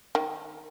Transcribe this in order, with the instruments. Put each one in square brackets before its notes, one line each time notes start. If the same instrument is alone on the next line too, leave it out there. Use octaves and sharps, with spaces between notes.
[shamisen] D#3